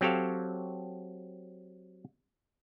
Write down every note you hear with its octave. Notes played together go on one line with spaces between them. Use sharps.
F#3 C4 G4 A4 C#5 F5